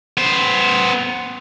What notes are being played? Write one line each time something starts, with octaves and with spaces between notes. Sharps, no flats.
B3 C5